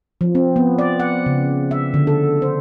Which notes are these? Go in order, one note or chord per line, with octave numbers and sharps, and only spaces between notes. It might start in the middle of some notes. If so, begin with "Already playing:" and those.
F3
C4
B3
D5
F#5
C#3
E5
D3
A4
C5